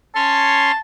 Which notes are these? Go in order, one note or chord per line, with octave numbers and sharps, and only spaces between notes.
C#4 C#5 A5 C6